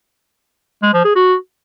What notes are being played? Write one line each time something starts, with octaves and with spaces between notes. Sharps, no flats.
G#3
F3
G#4
F#4